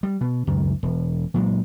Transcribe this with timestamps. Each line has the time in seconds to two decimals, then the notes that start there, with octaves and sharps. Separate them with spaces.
0.03 G3
0.21 B2
0.47 C#2 F#2 D#3
0.83 E1
1.34 A#2 F#3 G#3